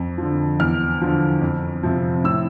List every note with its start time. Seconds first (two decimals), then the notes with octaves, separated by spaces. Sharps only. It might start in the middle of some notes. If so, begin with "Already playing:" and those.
Already playing: F2
0.18 D3 F3
0.60 E2 F6
1.01 D3 F3
1.41 F2
1.83 C3 F3
2.24 A2 E6